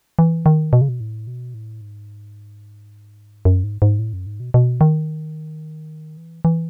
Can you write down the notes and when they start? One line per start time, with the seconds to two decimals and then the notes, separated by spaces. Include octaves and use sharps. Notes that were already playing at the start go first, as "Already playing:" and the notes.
0.19 E3
0.46 D#3
0.73 B2
0.81 C#3
0.89 B2
1.00 A2
1.27 B2
1.54 A2
1.81 G#2
3.45 F#2
3.64 G#2
3.82 G#2
3.99 A2
4.13 F#2
4.26 G#2
4.40 B2
4.54 B2
4.81 D#3
6.17 E3
6.45 E3